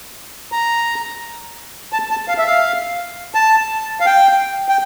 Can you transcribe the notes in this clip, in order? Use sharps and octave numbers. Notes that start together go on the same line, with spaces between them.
A#5
A5
A5
F5
E5
F5
A5
F5
G5
G5